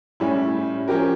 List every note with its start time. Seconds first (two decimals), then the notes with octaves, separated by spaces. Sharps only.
0.20 A2 G3 C#4 E4
0.88 F3 C#4 G4 A#4